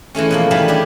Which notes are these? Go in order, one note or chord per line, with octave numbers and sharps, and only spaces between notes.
E3 G#3 A3 C#4
B2 F3 A#3
D#3 E3 G3 A3 F5 B5
G3 D4 G4 G#4